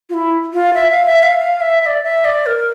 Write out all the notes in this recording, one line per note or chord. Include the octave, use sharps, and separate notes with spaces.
F4
E4
F4
E5
F5
E5
F5
F5
E5
E5
D5
E5
D5
A#4